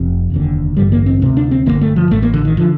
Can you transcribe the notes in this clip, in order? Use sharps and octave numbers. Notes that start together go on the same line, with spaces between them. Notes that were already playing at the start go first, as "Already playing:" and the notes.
Already playing: F1 F2 C3
F1 D#2 D3
A1 G2 D3 G3
A#3
C4
D2 C3 C4
D4
C4
G1 G2 D3 A#3
A3
F3
A1 A2 A3
A#3
D3
D#3
D3 F3